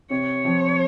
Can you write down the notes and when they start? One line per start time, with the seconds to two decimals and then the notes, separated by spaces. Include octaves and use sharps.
0.10 C3 C#5
0.44 F3 C4 F4